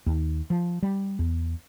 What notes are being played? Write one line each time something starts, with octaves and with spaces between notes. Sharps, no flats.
D#2
F3
G3
E2